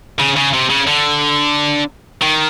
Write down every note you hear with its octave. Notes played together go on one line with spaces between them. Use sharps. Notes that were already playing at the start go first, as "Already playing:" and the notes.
C#3
C#3
C3
C#3
D3
D#3